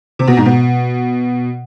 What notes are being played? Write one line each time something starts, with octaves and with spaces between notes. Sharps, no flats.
C3
B2
G#2
B2